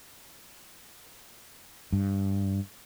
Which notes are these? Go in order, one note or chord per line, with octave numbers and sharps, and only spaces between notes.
G2